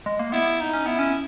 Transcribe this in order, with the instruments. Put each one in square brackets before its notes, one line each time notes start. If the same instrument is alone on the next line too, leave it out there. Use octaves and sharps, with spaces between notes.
[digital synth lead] G#3
A#3
[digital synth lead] B3 [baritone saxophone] E4
[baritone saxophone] D#4
[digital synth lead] C#4
[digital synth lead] B3 [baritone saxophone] E4
[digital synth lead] C#4